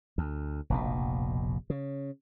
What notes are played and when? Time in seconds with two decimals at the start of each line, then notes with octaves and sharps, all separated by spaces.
0.18 D2
0.70 F1 A#1 B2
1.70 C#3